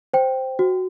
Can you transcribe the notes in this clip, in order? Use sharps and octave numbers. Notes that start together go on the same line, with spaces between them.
C5 G5
F#4